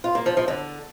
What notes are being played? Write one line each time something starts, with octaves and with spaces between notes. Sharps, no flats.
F4
A#3
F3
F3
D3